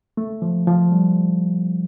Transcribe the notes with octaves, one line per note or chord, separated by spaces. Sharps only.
A3
F3
F3
G3